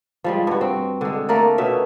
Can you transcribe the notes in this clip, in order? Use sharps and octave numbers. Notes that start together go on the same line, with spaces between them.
F3 G3 G#3
G2 F#4
C4
D3 G#3
A3 A#3 A#4 D5
B2 C#4 E5